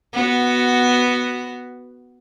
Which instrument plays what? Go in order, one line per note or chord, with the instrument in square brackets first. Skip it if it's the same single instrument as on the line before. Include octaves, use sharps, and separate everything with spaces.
[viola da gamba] B3 F#4